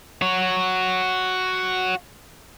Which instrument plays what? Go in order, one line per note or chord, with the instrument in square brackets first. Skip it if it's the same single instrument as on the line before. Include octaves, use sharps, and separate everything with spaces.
[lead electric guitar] F#4 C#5